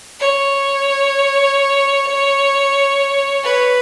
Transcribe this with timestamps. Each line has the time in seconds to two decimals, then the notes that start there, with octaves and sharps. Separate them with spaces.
0.20 C#5
3.43 B4